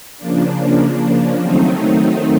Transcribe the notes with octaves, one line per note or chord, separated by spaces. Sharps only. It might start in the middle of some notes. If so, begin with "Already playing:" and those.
C#3 F3 A#3 D4
D#3 F#3 A3 C4 D#4